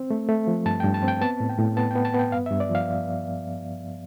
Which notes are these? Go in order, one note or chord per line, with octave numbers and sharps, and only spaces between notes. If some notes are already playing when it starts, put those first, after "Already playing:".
Already playing: C4
A3
A3
F3
G2 A5
G5
G2
A5
C4
G5
B3 A5
A2
G5
A2
B3 A5
G5
B3
A5
B3 G5
G2 F5
E5
G2
D5
F3
F5